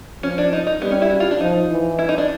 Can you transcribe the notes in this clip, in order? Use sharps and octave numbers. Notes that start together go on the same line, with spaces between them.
F3 C#4
D4
D#4
D#4
G3 B3
C#4
E4
F#4
F4
D4
F3 D#4
E3
E4
D#4
D4